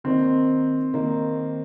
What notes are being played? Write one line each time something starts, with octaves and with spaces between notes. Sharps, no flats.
D#3 A#3 C4 D#4
D#3 A#3 D#4